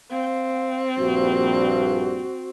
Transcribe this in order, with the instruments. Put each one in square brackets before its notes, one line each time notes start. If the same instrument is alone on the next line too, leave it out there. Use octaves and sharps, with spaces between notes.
[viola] C4 [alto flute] F5
[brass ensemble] A#1 G2 [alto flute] F#4